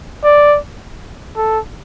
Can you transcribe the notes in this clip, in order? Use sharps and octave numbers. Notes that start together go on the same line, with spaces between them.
D5
A4